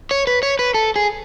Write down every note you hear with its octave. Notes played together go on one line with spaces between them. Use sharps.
C#5
B4
C#5
B4
A4
G#4